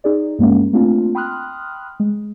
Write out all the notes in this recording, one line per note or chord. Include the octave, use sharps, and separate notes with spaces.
D#4 G#4 D5
G2 G#3 A#3 C#4
A3 A#3 C4 D4 F4
G5 B5 C6 D#6 F6 F#6
G#3